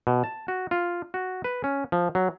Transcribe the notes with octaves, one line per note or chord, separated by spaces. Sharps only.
B2
A5
F#4
F4
F#4
B4
C#4
F3
F#3